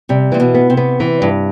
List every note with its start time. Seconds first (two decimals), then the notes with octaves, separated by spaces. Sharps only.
0.09 C3 G3
0.32 A#2 E3
0.40 B2
0.55 B3
0.70 C3
0.77 B3
1.00 E3
1.22 G2